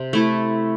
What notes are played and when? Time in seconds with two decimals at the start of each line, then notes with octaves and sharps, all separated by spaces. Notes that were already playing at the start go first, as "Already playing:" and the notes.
Already playing: C3 C4
0.13 A3 E4 A4